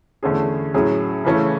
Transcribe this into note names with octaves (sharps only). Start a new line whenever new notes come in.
E2 D3 A3 C#4 G#4
A2 F#3 C#4 G#4
C#3 E3 A3 C#4